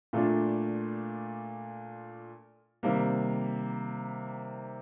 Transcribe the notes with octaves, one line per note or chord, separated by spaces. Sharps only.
A#2 A3 D4 F4
C3 D#3 G3 A#3